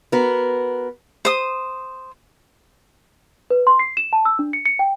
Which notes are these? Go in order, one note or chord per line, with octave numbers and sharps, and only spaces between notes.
B3 F#4 A#4
C5 D#6
B4
C6
C7
E7
A5
E6
D4
C#7
C#7
G5